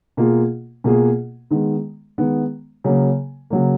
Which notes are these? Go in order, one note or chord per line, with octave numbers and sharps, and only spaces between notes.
B2 A#3 F4 G#4
B2 A#3 F4 G#4
D#3 G#3 B3
D#3 G#3 B3
C#3 F#3 A#3
C#3 F#3 A#3